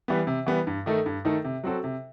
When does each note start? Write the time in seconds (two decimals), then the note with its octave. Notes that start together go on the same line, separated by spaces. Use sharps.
0.08 E3 G3 B3
0.27 C3
0.46 E3 G3 B3
0.67 G2
0.86 D#3 A3 D#4 A4
1.06 G2
1.25 D#3 A3 D#4 A4
1.44 C3
1.64 F#3 C4 F#4 A4
1.84 C3